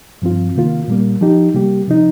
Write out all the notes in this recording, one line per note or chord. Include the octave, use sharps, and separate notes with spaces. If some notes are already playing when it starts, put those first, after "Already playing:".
G2 F3 C4 F4
C3 D#3 A#3 F4
A#2 G3 A#3
F3 D#4 G4
C3 G3 A#3 G4
C3 F3 D#4